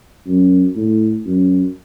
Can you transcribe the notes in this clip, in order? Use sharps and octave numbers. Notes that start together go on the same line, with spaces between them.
F#2
A2
F#2